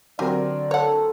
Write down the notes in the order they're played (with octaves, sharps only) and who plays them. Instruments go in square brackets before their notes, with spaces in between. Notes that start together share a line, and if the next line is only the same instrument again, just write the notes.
[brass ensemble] D3 D5 [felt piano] F#3 C4 A#4 [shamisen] G4 G#5
[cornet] A4 [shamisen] C#5 F#5